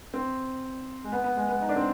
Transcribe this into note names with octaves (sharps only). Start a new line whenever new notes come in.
C4
G#3
B3
B3
G#3
B3
D#4
D4
C4